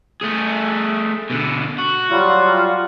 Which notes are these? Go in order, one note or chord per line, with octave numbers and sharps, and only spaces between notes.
A3 G#4
B2 D3
F#4
F#3 G3 F4